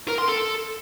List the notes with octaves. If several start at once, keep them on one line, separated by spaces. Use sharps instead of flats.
A#4
C6
A4